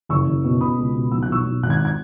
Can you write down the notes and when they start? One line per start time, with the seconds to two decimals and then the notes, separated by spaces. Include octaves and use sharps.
0.09 F#1 C#6 E6
0.26 F#1
0.44 B2
0.61 B2 B5 D#6
0.79 C#2
0.94 B2
1.12 B1 E6
1.23 F#6
1.29 B1 C#6 E6
1.46 B1
1.63 G#1 F#6
1.70 G#6
1.77 F#6
1.85 G#6